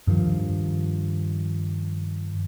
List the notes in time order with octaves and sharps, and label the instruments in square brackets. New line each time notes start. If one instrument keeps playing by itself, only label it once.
[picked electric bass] G2 D#3 F3